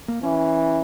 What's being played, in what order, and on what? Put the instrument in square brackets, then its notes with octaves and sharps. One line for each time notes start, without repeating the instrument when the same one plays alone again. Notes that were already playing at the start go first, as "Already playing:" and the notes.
[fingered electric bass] A#3
[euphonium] E3 [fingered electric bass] C#4